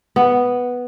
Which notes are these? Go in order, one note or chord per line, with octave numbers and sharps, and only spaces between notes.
B3